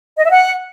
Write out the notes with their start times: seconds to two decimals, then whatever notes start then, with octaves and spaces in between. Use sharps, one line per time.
0.18 D#5
0.24 E5
0.30 F#5